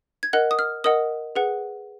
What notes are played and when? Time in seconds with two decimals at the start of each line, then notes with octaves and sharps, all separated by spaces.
0.23 G#6
0.33 A#4 D#5 F#5 F#6
0.51 D#6
0.59 F6
0.84 A#4 D#5 F#5 D#6
1.36 G#4 B4 F#5